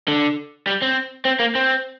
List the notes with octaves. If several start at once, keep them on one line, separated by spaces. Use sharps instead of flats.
D3
G3
C4
C4
A#3
C4